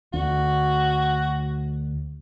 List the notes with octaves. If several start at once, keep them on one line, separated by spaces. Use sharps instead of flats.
D2 F#4